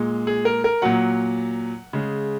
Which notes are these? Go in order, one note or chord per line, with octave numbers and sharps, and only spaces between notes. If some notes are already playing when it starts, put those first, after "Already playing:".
Already playing: A#2 G#3
G#4
A#4
A#4
A#2 F#3 F#5
C#3 G#3